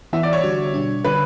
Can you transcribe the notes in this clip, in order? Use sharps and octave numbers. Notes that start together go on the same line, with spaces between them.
E3 B3 E4 E5
D5
C#5
D3 G3 D4 F#4
B2 G3 D4
D3 G3 D4 B4